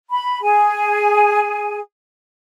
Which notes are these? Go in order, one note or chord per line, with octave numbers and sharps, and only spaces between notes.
B5
G#4 G#5